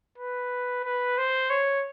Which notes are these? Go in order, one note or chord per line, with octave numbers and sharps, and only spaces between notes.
B4
B4
C5
C#5